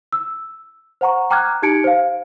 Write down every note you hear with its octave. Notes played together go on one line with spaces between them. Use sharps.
E6
C5 F#5 A#5 C#6
G5 A#5 D6 F6 F#6 G#6
D#4 G4 A5 G#6 C#7 D7
C5 F5